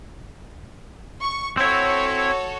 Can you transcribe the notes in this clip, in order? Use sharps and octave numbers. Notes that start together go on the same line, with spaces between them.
C#6
C4 E4 F#4 A4 C#5